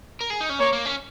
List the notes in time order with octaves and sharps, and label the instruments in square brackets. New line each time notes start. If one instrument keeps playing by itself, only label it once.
[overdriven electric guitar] A#4
G#4
D#4
C#4
[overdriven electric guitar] A#3 [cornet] C#5
[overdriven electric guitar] A#3
C#4